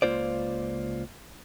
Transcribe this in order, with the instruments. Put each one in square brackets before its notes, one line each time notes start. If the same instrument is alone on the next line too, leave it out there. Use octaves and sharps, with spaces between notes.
[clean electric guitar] C#2 A#2 A#3 F4 C5 D5